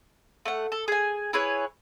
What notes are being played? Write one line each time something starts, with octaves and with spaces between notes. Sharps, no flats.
A3 F#5
A4
G#4 G#5
E4 G#4 B4 C#5